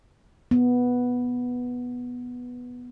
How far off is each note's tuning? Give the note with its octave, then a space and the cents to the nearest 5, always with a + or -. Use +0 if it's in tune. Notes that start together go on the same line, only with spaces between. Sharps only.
B3 -5